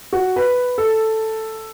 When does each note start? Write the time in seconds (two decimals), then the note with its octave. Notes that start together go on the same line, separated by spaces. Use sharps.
0.13 F#4
0.36 B4
0.78 A4